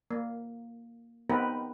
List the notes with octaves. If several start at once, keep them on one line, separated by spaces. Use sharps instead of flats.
A#3
B3 C4 D#4 G4 A#4 B4